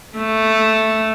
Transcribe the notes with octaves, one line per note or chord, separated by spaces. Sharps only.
A3